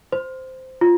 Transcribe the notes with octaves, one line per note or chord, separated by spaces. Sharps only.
C5
F4